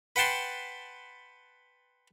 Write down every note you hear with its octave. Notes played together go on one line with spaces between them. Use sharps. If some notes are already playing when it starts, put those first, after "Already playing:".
B4 F#5 G5 A5 C6